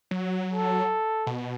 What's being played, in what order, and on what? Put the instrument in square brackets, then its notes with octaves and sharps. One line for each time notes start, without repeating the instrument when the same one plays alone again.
[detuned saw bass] F#3
[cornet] A4
[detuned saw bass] B2